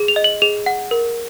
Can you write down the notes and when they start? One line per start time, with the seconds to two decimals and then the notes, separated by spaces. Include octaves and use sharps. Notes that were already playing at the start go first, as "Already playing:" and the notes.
Already playing: G#4
0.08 F7
0.16 D#5
0.24 F#7
0.42 G#4 F7
0.66 F#5
0.91 A#4